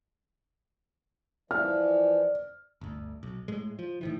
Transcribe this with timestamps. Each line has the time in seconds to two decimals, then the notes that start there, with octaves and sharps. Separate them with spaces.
1.51 E3 F3 D5 F6
2.81 G1 D2
3.23 B1
3.48 A2 G#3
3.79 F3
4.01 A2 D#3 E3